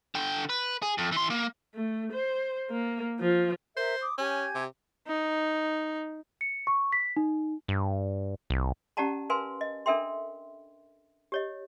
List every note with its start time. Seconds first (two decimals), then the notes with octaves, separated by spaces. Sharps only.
0.15 D3 G5
0.49 B4
0.82 G#4
0.98 F2
1.12 E3 C6
1.30 A#3
1.75 A3
2.13 C5
2.71 A#3
3.20 F3
3.77 A#4 C5 E5
4.01 D6 D#6
4.18 C#4 G4 G#5 G#6
4.55 C3
5.07 D#4
6.41 C#7
6.67 C#6
6.92 B6
7.17 D#4
7.68 G2
8.50 C2
8.97 C#4 G4 D5 F#5 A5 A#5
9.30 A#4 B4 F5 G#5 C6
9.61 D#5
9.86 D4 A4 A#4 E5 G5 C6
11.32 G4 C#5 D#5